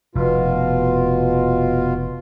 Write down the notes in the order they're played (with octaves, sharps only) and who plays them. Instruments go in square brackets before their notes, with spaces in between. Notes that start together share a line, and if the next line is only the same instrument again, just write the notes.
[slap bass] F1 [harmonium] B2 F4